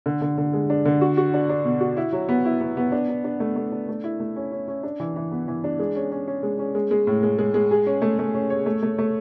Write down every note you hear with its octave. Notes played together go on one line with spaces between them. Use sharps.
D3
D3
D3
G#3
D4
D3
F#4
F#4
D4
D4
B2
F#4
E4
F#3
B3
E4
B3
B3
D4
D4
D4
A3
A3
D4
A3
E4
A3
C#4
C#4
C#4
D4
E3
E3
B3
E3
D4
G#3
C#4
C#4
C#4
G#3
C#4
G#3
G#3
A2
G#3
G#3
G#3
G#4
C#4
A3
A3
C#4
C#5
A3
A3
A3